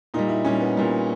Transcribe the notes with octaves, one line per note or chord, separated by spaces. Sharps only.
A#2 G3 D#4
E4
A#2 G3 C#4
B3
A#2 G3